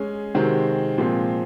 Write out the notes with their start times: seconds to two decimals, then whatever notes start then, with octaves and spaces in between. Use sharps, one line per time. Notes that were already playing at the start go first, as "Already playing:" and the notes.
Already playing: G#3 C#4 G#4
0.34 C3 D#3 G#3 C4 F#4
0.98 A#2 F3 G#3 C4